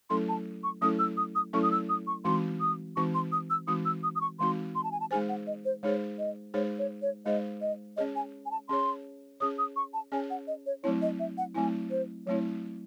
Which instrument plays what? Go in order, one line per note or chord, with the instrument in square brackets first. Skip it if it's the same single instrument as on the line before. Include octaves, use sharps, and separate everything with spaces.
[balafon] F#3 A3 C#4 E4 A4 [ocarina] C6
[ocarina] A5
C#6
[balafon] F#3 A3 C#4 E4 A4 [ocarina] D#6
[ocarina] E6
D#6
D#6
[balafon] F#3 A3 C#4 E4 A4 [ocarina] C#6
[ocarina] D#6
E6
D#6
C#6
[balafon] E3 G#3 C4 D#4 F#4 [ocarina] C6
[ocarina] D#6
[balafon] E3 G#3 C4 D#4 F#4 [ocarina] C#6
[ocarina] C6
D#6
E6
[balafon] E3 G#3 C4 D#4 F#4 [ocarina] D#6
[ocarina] E6
D#6
D#6
C#6
[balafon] E3 G#3 C4 D#4 F#4 [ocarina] C6
[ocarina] C6
A5
G#5
A5
[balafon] G#3 D#4 G#4 C5 [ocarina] G#5
[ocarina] F#5
D#5
C5
[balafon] G#3 D#4 G#4 C5 [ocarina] C#5
[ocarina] D#5
[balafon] G#3 D#4 G#4 C5 [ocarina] C#5
[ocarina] C#5
C#5
[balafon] G#3 D#4 G#4 C5 [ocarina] D#5
[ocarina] D#5
[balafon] C#4 G#4 C#5 [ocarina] D#5
[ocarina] G#5
G#5
A5
[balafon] C#4 G#4 C#5 [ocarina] C6
[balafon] C#4 G#4 C#5 [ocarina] D#6
[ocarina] D#6
C#6
A5
[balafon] C#4 G#4 C#5 [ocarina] G#5
[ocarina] F#5
D#5
C#5
[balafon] F#3 A3 C4 E4 [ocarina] C#5
[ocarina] D#5
E5
F#5
[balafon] F#3 A3 C4 E4 [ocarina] G#5
[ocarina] C5
[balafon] F#3 A3 C4 E4 [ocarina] C#5